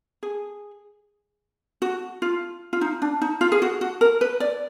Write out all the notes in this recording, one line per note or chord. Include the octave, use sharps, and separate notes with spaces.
G#4
F#4
F4
F4
D#4
D4
D#4
F4
G#4
F#4
F#4
A#4
B4
D5